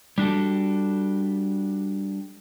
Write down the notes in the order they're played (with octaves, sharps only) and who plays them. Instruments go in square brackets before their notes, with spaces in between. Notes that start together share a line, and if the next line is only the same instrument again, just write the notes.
[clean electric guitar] G3 D4 F#4 G4 A4